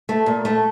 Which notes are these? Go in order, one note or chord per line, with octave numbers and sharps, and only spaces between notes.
A3
A#2
A3